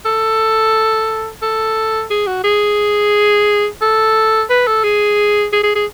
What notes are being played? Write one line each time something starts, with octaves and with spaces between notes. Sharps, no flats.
A4
A4
G#4
F#4
G#4
A4
B4
A4
G#4
G#4
G#4
G#4